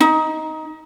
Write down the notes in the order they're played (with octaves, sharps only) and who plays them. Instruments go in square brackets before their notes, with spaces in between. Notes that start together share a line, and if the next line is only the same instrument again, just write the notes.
[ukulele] D#4